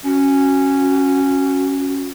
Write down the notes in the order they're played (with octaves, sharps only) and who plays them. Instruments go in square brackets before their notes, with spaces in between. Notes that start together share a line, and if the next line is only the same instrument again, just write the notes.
[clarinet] C#4 [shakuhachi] F#4